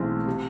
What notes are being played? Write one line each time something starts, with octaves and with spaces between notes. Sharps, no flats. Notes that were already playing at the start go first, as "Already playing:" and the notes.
Already playing: B1 A2 E3 G#3 C4
C3